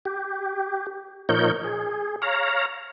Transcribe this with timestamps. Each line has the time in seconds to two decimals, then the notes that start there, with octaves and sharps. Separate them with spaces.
0.05 G4
1.29 A#2 F3 D#4 A#4 C#5 G6
1.64 G#4
2.22 C#5 F5 A#5